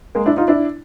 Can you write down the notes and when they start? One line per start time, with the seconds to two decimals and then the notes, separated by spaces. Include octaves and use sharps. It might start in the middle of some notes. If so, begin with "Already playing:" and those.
0.15 G#3 A#3
0.26 D4 E4
0.37 D#4 F4
0.48 D4 E4